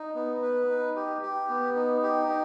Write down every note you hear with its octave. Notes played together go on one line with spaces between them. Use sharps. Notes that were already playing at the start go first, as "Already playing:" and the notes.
Already playing: D#4
B3
B4
D#4
G4
G4
B3
D#4
G4
D#4